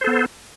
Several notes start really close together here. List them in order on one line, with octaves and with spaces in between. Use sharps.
C5 A4 B3